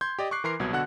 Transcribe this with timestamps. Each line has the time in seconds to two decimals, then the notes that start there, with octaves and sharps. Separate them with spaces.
0.01 C6 G6 G#6
0.19 G4 D5 D#5
0.31 C#6 D6 F#6 C7
0.44 E3 A#4 A#5 C6 C7
0.60 C2 B2 F#3 G#6
0.73 B2 D3 F#4 A4 F#5 F#6